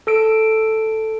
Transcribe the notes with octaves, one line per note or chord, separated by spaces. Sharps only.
A4 E6 D7